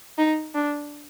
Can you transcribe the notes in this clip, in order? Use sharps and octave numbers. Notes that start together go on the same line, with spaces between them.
D#4
D4